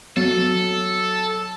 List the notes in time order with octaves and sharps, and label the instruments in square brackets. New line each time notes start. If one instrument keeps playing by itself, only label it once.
[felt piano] F#3 [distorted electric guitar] A4